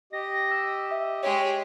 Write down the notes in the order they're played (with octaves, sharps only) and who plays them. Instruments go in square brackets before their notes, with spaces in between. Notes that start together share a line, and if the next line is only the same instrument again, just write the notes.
[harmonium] G4 D#5 [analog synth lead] A#6
[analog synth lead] E6
E5
[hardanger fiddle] G#3 G4 [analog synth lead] C#5